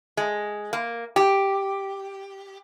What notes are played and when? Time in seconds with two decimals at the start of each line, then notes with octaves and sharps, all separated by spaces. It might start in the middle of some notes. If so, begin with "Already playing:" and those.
0.17 G#3
0.73 A#3
1.16 G4